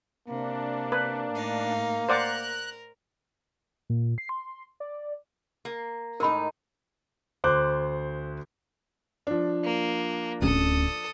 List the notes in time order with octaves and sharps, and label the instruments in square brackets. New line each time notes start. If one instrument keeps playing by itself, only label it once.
[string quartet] C3 [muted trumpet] A#3 [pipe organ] D4
[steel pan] B4
[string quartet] A2 D#4 F5
[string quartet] A#4 [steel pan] C5 D5 F#5 [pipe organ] F#6
[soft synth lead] A#2
C7
C6
D5
[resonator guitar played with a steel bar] A#3
[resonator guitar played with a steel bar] A2 G#3 D#4 [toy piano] A#4 B5
[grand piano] D2 C5 D6 F#6
[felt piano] F3 D4
[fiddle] A#3
[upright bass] D1 C#4 [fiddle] A4 D#6